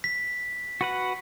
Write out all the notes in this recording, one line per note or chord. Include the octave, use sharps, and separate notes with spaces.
B6
F#4 B4 F#5